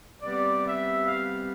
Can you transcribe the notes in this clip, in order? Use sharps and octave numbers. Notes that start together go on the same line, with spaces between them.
C3 G3 B3 D5
E5
F5